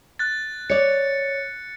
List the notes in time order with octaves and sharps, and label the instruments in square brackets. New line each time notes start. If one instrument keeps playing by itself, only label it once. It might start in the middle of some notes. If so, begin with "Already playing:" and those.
[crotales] F#6 A6
[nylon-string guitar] C#5 D5 [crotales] C#7